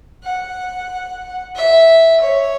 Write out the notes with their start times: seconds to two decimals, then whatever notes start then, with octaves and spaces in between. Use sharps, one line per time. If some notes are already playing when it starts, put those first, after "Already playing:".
0.24 F#5
1.55 E5
2.20 C#5